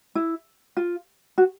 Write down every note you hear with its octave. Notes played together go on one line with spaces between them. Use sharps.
E4
F4
F#4